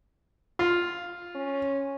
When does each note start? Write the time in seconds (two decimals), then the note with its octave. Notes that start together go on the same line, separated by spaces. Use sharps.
0.59 F4
1.35 C#4